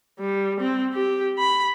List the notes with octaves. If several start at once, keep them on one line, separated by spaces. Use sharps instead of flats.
G3
C4
G4
B5